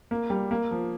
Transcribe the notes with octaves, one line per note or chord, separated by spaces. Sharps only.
A#3
G3
A#3
F3